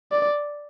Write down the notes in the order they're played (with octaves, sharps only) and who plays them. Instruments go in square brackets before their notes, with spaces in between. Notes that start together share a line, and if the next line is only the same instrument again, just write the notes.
[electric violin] D5